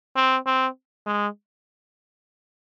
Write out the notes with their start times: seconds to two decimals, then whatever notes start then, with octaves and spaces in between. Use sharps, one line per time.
0.16 C4
0.46 C4
1.06 G#3